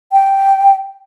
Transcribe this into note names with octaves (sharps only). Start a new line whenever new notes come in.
G5